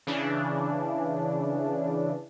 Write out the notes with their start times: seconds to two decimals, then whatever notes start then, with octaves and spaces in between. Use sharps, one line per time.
0.07 C#3 E3 D4